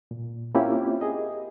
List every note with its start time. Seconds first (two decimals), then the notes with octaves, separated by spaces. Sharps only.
0.11 A#2
0.55 A#3 C4 C#4 E4 F4 G4
1.01 G#4 D#5